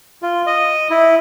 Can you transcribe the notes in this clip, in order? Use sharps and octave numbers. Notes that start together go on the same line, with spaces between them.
F4
D#5
E4